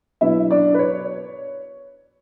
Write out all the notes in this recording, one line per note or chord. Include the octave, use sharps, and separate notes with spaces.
B2 F#3 B3 D4 E4 E5
D4 D5
B4
C#5